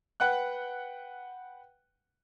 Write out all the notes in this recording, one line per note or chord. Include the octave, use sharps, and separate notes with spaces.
B4 F#5 G5 F#6